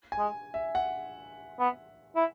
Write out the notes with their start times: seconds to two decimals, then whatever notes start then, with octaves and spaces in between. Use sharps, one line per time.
0.12 G#5
0.19 G#3
0.54 E5
0.75 F#5
1.60 B3
2.16 E4